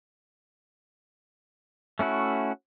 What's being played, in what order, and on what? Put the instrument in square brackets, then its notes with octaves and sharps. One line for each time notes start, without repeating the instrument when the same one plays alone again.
[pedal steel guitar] A3 C#4 E4 F#4